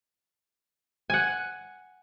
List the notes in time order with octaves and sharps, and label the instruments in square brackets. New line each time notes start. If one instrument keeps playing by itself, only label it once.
[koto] F#5 G#5